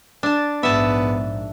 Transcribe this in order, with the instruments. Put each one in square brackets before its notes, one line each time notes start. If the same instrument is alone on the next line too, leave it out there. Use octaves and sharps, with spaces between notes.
[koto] D4 A5
[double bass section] A#1 G#2 [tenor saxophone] B3 [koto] E5 A5